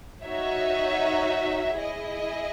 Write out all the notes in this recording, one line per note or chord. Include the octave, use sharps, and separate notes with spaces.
D#4 F#4 C#5 E5
E4 G#4 D#5